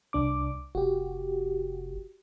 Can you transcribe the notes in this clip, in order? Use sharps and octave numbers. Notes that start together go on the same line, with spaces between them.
C2 D4 D6
F1 F#4 G4